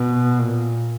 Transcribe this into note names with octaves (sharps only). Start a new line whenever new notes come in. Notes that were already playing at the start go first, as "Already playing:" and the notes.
Already playing: B2
A#2